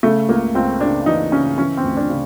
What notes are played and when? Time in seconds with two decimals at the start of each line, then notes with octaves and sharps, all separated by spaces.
0.03 C#3 A3
0.29 C#2 A#3
0.55 C#2 C4
0.81 C#3 D4
1.06 E3 D#4
1.32 C#3 C#4
1.58 E3 C#4
1.77 C4
1.84 D2
1.97 D4
2.10 C#3